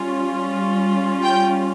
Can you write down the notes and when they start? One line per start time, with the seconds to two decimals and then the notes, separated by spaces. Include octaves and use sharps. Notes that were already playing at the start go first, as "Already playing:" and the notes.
Already playing: G3 C#4 F4
1.24 G5